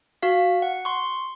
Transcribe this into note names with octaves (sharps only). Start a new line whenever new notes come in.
F#4 F5
F#5
C6 C#6